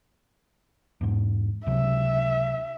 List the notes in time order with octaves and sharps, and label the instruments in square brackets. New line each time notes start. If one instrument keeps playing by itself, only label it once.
[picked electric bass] E2 G#2
[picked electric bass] C#2 C3 F#3 [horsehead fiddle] E5